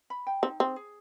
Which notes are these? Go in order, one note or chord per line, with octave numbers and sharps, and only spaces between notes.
B5
G5
C4 D#4
C4 G#4
G#4